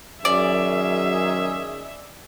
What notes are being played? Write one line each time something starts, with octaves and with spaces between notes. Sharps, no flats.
F#2 D#3 C#4 G#4 D5 E5